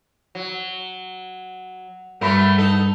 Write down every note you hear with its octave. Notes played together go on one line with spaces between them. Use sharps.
F#3
G2 F#3 A3 A#4 B5
D#4 A4